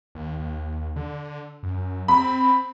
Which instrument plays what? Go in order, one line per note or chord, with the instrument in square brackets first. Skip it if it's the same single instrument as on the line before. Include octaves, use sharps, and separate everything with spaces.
[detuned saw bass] D#2
D#2
D3
F#2
[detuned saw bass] C4 [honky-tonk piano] B5